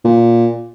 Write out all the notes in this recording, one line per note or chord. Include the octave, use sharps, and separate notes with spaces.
A#2